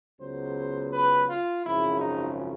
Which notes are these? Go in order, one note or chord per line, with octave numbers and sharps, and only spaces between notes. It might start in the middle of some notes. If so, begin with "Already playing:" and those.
C#2 C#3 F#3 B3 C5
B4
F4
G#1 F#2 C#3 F3 E4
D#4